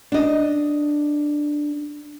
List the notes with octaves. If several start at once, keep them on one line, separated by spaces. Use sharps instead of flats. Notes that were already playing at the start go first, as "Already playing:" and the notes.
D4 D#5